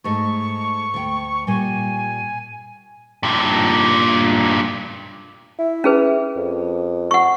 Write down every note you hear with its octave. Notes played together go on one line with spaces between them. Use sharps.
G#2 A3 D#5 C#6
D2 G5
A#2 G3 G#5
G2 A#2
E4
C#4 G#4 B4
F2
F#5 C#6